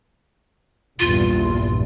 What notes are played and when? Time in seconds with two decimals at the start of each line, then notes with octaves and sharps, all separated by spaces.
1.00 A#1 E2 G2 F4